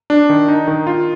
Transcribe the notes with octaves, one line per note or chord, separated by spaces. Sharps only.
D4
D#3
D#4
D#3
F4